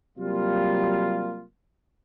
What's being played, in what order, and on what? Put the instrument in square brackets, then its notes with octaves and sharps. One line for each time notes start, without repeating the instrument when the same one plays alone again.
[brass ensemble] C3 F#3 G3 A#3 F4